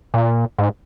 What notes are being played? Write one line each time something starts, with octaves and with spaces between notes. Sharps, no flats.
A#2
G#2